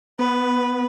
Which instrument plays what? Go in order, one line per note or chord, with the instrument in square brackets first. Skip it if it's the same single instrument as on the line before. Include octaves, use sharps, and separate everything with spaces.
[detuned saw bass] B3 [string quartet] B4